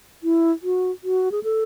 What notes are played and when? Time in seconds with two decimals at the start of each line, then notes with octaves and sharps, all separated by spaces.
0.23 E4
0.63 F#4
1.04 F#4
1.32 G#4
1.43 A4